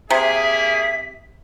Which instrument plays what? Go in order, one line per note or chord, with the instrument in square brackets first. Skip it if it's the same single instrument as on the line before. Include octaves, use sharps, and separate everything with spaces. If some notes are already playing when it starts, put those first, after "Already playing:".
[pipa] C3 [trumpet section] G3 A#3 G#4 [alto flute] E5 [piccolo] B6